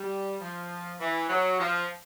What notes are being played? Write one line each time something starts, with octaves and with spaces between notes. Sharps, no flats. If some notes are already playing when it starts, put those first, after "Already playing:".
Already playing: G3
F3
E3
F#3
F3